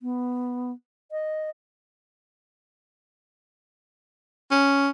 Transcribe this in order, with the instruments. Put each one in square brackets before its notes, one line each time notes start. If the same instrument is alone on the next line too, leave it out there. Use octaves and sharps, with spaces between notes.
[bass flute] B3
D#5
[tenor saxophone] C#4